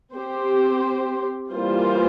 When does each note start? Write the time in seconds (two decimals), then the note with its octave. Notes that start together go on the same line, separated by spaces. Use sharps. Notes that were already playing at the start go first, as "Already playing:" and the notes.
0.16 C4 G4 C5
1.53 E3 G3 A#3 F4 C5